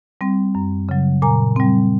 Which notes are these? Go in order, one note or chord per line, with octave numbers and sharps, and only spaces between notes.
G3 C4
F#2
C#3 F#3
A#2 G#5 A#5
G3 C4